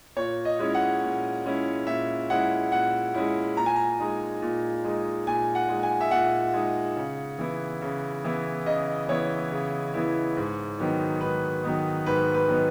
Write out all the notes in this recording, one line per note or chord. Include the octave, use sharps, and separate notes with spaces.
A#2 C#5
D#5
G#3 C#4 E4
F#5
A#2
G#3 C#4 E4
A#2 E5
G#3 C#4 E4 F#5
A#2 F#5
G#3 C#4 E4
A#2 A#5
G#5
A#5
G#3 D#4
A#2
G#3 D#4
A#2 G#5
F#5
G#3 D#4
G#5
E5
A#2 F#5
G#3 D#4
C#3
E3 B3 E4
C#3
E3 B3 E4
C#3 D#5
E3 B3 E4 C#5
C#3
E3 B3 E4
G#2
D#3 F#3 B3 D#4
G#2 B4
D#3 F#3 B3 D#4
G#2 B4
B4
D#3 F#3 B3 D#4